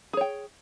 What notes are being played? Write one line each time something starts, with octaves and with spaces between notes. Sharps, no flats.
G#4 C#5 G5